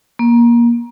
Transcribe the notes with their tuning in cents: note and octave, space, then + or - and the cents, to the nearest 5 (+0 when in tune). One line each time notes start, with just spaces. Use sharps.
A#3 +20